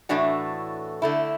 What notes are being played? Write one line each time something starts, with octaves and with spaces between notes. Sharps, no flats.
A2 E3 A3 D4 F#4
D3 A3 E4